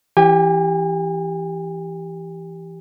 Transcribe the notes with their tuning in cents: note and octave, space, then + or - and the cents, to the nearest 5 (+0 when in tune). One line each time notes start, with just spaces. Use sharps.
E3 +15 G4 +0 G#5 -40